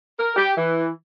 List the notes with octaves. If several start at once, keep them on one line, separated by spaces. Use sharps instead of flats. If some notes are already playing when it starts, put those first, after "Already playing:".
A#4
G4
E3